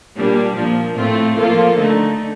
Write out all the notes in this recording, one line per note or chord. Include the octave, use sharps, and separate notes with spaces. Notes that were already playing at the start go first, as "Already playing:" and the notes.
A#2 G3 A#3 D4
A#2 F3 A#3
A2 A3 C4 F4
F3 A#3 F4 A4
D3 A3 D#4